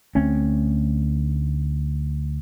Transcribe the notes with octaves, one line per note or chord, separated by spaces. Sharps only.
D2 A3 C4 C#4